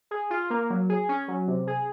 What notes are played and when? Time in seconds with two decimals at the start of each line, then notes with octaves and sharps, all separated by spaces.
0.11 G#4
0.30 F4
0.50 A#3
0.70 F#3
0.89 G#4
1.09 C#4
1.28 F#3
1.48 C3
1.67 G#4